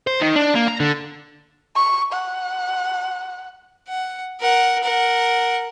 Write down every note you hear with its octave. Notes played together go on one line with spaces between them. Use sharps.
C5
D#3
D4
A#3
A#5
D3
C#6
F#5
F#5
A#4 F#5
A#4 F#5